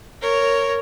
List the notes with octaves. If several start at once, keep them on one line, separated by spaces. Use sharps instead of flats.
A#4 C#5